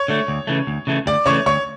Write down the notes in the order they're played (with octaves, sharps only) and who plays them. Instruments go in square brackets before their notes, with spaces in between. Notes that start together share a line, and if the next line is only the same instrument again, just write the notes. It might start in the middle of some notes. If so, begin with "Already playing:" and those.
Already playing: [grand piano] C#5 C#6
[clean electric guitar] D3 A3
D2
C#3 E3 A3
D2
C#3 E3 A3
[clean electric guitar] D2 [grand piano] D5 D6
[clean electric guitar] C#3 E3 A3 [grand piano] C#5 C#6
[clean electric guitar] D2 [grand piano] C#5 C#6